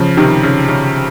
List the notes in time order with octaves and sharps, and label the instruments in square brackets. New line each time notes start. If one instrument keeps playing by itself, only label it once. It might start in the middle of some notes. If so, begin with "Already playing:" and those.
Already playing: [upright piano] C#3 F3
C3 D#3
C#3
C#3